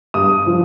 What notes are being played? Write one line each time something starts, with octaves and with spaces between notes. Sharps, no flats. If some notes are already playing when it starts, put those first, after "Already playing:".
G2 D#6
F3